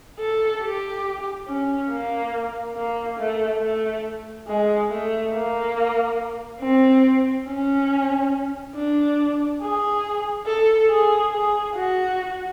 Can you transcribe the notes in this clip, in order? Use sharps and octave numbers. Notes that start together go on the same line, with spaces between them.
A4
G4
C#4
A#3
A#3
A3
A3
G#3
A3
A#3
C4
C#4
D4
G#4
A4
G#4
G#4
F#4